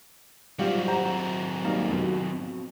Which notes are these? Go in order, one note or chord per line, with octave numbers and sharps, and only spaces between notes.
F#3 G3 C4 F4 G4
C5 F#5 A#5
G3 A#3 D#4
F2 B2